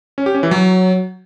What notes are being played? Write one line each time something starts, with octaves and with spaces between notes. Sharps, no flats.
C#4
G4
C#4
E3
F#3